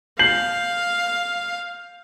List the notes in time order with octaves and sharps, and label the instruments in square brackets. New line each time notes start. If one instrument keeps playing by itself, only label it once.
[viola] F5 [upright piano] G6 C7 F#7